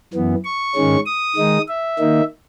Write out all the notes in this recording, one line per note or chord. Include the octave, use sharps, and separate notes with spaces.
F#2 E3 B3
C#6
G#2 D#3 G#3 C#4
D#6
D#3 G#3 D#4
E5
D#3 A#3 D#4